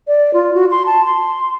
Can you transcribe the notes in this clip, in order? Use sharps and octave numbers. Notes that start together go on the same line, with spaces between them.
D5
F4
F#4
C6
A5
C6